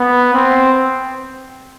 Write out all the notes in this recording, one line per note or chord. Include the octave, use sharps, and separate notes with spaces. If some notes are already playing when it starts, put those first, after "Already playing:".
Already playing: B3
C4